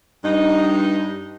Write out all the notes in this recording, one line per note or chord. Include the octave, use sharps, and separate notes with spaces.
G2 D#4